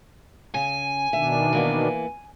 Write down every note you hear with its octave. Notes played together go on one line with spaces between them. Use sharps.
C#3 G#5
B2 D#3 D4 E5
E3 A#3 B3